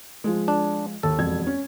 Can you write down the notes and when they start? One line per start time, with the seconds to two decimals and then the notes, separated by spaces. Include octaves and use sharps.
0.24 F3 G#3
0.48 D4
1.03 D#2 A4
1.18 E1 F2 G#6
1.47 C#4